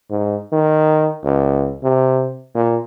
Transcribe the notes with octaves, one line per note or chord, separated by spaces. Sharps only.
G#2
D#3
C#2
C3
A#2